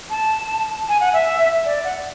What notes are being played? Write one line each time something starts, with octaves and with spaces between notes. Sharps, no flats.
A5
G#5
F#5
E5
D5
F#5